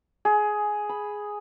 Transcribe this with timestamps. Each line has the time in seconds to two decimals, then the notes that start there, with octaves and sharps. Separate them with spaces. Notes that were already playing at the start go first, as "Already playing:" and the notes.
0.25 G#4
0.89 B5